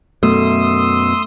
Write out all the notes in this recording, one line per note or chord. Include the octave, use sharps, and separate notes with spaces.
F#2 B2 A3 C6 D#6 E6